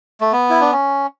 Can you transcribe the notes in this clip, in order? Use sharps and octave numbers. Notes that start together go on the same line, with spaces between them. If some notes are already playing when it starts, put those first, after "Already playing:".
A3
B3
E4
D4
C#4